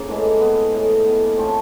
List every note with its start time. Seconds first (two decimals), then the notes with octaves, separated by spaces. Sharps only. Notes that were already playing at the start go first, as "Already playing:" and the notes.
Already playing: C#3 A#3 C4
0.08 A2 E3 G#3
0.40 B3
0.73 A2 E3 G#3
1.06 B3
1.22 A#3
1.38 A2 F3 A3 C4